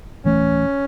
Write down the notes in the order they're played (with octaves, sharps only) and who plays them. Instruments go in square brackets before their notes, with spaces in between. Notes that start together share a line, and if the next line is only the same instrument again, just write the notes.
[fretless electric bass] D1 E3 A3 [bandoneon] C#4